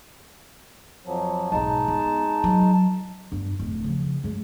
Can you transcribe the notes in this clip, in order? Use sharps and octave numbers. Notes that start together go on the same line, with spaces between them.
F2 F3 F#3
B1 G#2 G#3 D#4 A5
B3
F#3
G2 B3
D1 F2
C#3 F3
F#2 G#3